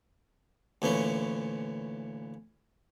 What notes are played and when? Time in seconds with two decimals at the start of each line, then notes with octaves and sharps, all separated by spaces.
0.82 D2 A#2 E3 C#4